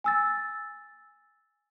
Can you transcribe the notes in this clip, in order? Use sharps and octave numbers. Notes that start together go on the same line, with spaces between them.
G#5 E6 A6